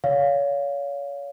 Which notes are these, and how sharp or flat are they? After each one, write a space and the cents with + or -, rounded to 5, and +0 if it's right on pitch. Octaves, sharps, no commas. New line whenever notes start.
C#5 +30 F5 +10